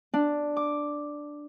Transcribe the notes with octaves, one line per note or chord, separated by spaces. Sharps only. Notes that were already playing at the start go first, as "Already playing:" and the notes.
D4
D6